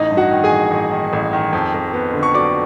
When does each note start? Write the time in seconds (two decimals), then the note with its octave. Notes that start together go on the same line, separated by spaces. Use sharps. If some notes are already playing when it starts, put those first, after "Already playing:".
Already playing: A1 D#4 D#5
0.11 G2
0.17 F#4 F#5
0.31 D#3
0.44 G#4 G#5
0.52 A1
0.71 A1
0.91 D#3
1.13 A1
1.33 D#3
1.53 F2
1.74 F2
1.94 B3
2.14 D3
2.23 C#6
2.34 F#3 D5 D6